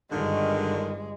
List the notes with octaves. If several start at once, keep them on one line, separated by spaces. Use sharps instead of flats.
G1 D3 D#3 G#3